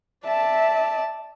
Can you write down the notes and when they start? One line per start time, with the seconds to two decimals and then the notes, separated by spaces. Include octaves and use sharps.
0.24 D5 E5 A5